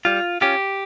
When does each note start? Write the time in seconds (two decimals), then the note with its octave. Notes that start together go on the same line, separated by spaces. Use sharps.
0.05 G3 F4
0.41 C#4 F4 G4